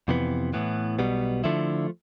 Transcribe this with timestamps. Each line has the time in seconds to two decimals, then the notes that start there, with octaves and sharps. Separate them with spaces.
0.08 F2 C3 E3 B3
0.53 A2 E3 B3
0.99 B1 B2 G3 B3
1.44 D3 F3 A3 E4